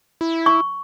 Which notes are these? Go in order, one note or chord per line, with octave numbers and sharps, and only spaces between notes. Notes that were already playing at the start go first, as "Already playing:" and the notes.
E4
C#6